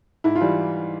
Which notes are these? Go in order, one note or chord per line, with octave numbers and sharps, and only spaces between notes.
G#2 E4
F4
E3 G3